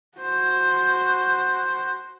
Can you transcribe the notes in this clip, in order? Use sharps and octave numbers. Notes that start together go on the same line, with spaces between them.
F#4 C5